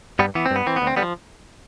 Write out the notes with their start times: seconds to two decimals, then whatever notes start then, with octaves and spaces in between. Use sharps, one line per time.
0.19 G2 G3 B3
0.35 E3 B3
0.46 C4
0.51 G2 B3
0.67 E3 C4
0.76 B3
0.82 D2
0.87 C4
0.96 D3 G3 B3
1.02 F3